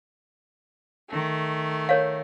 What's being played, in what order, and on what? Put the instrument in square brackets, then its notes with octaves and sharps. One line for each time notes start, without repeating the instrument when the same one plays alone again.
[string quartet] D#3 A3
[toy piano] A#4 C#5 F5